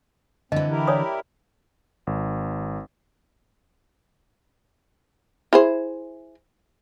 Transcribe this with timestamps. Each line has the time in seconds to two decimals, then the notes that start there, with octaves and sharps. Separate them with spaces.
0.52 D3 E3 C4 D#5
0.70 E4 G4 A#4
0.87 C#5 D5 D#6
2.07 G#1
5.53 E4 G#4 C5